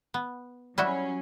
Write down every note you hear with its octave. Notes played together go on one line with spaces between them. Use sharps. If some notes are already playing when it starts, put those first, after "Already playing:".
B3
F#3 G3 C#4 E4 F#4